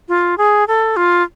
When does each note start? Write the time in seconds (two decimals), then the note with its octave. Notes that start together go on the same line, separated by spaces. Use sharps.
0.08 F4
0.38 G#4
0.68 A4
0.97 F4